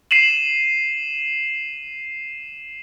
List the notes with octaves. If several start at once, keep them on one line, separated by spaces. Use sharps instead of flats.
C7 D#7 E7 F#7